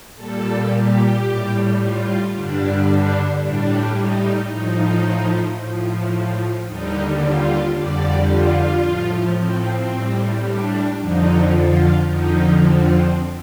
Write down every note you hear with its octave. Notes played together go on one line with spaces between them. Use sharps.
A#2 G3 A4
G4
A2 G3
F4
G2 D3 G3 D4
D4
A2 G3 D4
D#4
A2 F3 D#4
A2 F3
D#2 D3 G3 D#4
F4
F2 D3 G3 D5
F4
A2 F3
C4
A2 G3
D4
F2 D3 F3 D#4
F4
F2 D3 F3 D#4
C4